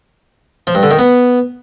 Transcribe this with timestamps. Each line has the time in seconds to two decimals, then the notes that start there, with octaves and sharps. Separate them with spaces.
0.67 F3
0.75 G2
0.83 D3
0.91 D#3
0.99 B3